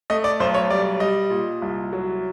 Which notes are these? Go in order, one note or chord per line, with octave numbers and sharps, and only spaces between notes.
A3 D#5
D5
B1 C5
C#5
G3 D5
G3 D#5
A#2
C2
F#3